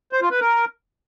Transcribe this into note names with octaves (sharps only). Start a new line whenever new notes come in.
C5
F4
B4
A#4